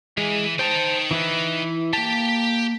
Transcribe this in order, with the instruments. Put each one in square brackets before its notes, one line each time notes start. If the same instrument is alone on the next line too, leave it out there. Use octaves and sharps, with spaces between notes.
[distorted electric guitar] E3 [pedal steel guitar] G#3 G#4
[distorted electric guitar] D#4 G5 [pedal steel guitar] C5 A5
[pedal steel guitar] E3 E4 B4
[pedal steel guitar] A#3 A5 [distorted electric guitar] G4